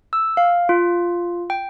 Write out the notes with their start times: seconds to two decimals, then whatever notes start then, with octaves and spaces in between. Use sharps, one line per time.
0.13 E6
0.37 F5
0.69 F4
1.50 G5